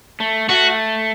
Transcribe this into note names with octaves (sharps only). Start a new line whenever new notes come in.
A3
A3 F#4